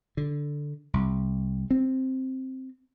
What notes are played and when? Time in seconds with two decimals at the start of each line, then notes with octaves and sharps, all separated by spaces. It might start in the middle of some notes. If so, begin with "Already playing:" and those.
0.17 D3
0.94 C2
1.71 C4